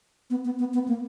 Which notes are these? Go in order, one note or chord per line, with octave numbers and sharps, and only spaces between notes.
B3
B3
B3
B3
A#3